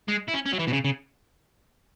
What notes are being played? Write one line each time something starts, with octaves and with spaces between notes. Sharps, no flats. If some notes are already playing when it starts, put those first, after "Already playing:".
G#3
E4
C#4
C#4
F#3
E3
B2
C#3
C#3